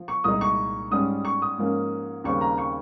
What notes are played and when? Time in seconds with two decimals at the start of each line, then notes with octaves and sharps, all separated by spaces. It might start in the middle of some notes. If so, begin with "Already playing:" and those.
Already playing: F3
0.08 C#6
0.24 C2 A#2 G#3 D#4 D#6
0.41 C#6
0.91 G#2 G3 C#4 D#6
1.25 C#6
1.42 D#6
1.58 G#2 F3 A#3 C#4
2.24 D#2 C#3 G3 C4 C#6
2.41 A#5
2.58 C#6